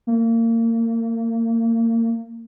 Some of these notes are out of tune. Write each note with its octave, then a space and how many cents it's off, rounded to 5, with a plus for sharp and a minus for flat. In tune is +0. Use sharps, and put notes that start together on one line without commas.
A#3 -30